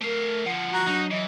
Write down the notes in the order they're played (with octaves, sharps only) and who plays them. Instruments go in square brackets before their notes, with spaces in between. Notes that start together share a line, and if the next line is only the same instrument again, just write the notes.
[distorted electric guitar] A3 F5 [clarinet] A#4
[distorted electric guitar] D3 F3 [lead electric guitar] F#5
[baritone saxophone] F#4 [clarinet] A#5
[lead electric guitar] F#3 [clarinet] D4 [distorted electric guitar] D#4
[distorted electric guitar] E3 [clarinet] D#5